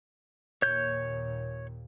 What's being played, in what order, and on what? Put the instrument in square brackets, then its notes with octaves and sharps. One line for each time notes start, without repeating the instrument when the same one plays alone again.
[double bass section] D#2 A#2 [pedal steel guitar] C#5 G6